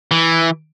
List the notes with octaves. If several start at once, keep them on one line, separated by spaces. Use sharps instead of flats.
E3